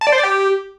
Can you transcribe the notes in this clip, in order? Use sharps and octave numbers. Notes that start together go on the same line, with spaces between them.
A5
D5
C5
D5
G4